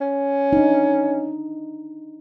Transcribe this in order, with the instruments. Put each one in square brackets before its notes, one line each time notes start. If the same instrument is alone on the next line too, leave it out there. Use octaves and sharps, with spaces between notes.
[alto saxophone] C#4
[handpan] D4 D#4